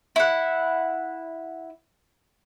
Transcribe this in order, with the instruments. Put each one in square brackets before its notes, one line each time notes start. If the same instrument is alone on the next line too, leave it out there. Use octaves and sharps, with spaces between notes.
[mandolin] E4 F#5